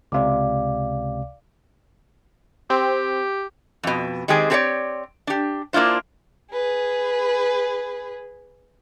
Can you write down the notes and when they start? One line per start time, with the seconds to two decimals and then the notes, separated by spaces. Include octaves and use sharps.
0.12 C#2 C3 D5 F5 D6
2.70 C4 G4
3.83 F2 B2
4.28 D#3 G#3 C4 G4 G#4
4.50 C4 G4 G#4 B4 C#5 D5
5.27 D4 G4
5.73 A#3 D4 E4 F4 C5
6.53 G#4 B4